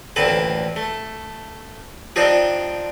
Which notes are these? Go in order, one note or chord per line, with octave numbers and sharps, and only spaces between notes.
A1 D2 A#3 C4 B4 A5
A3
F3 C4 D4 D#4 F4 G4